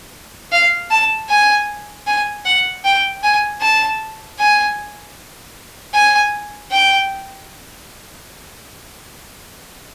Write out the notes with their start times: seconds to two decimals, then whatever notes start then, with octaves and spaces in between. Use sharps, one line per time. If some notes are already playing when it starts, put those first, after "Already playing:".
0.52 F5
0.90 A5
1.29 G#5
2.07 G#5
2.45 F#5
2.84 G5
3.23 G#5
3.61 A5
4.39 G#5
5.94 G#5
6.71 G5